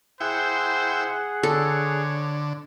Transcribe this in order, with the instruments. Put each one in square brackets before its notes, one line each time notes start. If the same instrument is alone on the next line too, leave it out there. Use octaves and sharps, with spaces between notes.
[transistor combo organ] E4 G5 [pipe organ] G#4 F#5 [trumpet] C5
[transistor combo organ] D3 [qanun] A4 [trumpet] C#5